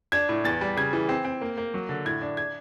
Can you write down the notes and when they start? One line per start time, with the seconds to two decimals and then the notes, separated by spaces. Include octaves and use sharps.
0.12 D4 G#6
0.29 A2
0.44 E2 A6
0.61 G3
0.77 C#3 G#6
0.93 E3
1.09 C4
1.25 C4
1.41 A#3
1.58 A#3
1.74 F#3
1.89 D3
2.05 A2 G#6
2.21 D4
2.37 G#6